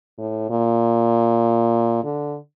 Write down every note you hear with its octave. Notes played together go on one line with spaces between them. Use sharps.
A2
A#2
D3